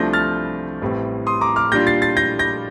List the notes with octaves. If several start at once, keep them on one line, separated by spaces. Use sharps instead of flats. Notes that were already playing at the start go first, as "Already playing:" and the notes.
Already playing: C2 C3 F3 A3 D4 G6 A#6
F6 A6
A1 A2 G3 C4
C6 D#6
A#5 D6
D6 F6
A#2 G3 D4 F4 G6 A#6
A6 C7
A6 C7
G6 A#6
G6 A#6